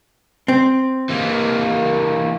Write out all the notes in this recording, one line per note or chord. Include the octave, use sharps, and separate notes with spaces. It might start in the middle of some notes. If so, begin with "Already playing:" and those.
C4
E3 A#3